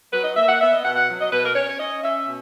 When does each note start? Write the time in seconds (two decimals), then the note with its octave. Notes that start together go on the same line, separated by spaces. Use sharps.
0.12 F#3 B4
0.24 D#5
0.36 A#3 E5
0.48 F#5
0.60 B3 E5
0.72 D#5
0.84 B2 F#5
0.95 F#5
1.08 F#3
1.20 D#5
1.31 B2 B4
1.43 A#4
1.55 C#4 C#5
1.69 C#5
1.79 C#4 D#5
2.03 C#4 E5
2.26 B2